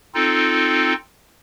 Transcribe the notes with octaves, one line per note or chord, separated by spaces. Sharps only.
C4 D#4 F4 A4